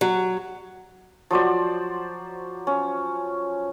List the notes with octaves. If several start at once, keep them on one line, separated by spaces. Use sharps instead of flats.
F#3
F3 F#3 C5 D5
C#4